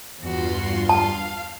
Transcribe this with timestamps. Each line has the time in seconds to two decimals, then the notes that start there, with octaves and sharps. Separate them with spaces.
0.21 E2 G2 F4 F#4 C6
0.89 F5 A5